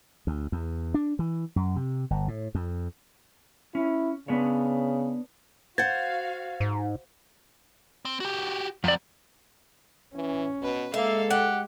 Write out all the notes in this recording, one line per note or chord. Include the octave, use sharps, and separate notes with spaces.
D2
E2
D4
E3
F#2
C3
G1
A2
F2
C#4 E4
C#3 B3 D4 C#5
F#4 C5 F5 F#5 G#6 A6
G#2
C4
F#4 G4
F2 F#3 C4 D5
E3 C#4
B2 B4
G#3 A#3 A4 E5 F5
G4 F#5